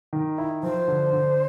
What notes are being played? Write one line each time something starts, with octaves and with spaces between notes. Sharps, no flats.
D#3
E4
F3 C5
D3
D3